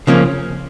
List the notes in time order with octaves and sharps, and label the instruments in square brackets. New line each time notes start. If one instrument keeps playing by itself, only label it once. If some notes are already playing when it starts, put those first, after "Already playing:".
[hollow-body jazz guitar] C#3 F3 A#3 C#4